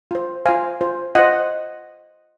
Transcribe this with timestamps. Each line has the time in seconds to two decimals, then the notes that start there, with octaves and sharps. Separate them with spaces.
0.11 F4 C5
0.46 F4 C5 F5 G#5
0.81 F4 C5
1.15 F4 C5 D#5 F#5